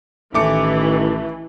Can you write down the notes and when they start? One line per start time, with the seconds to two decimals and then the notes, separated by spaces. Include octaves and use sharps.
0.34 A1 D#3 E3 A3 D6 C#7